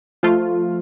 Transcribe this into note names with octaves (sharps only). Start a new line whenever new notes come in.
F3 A3 F4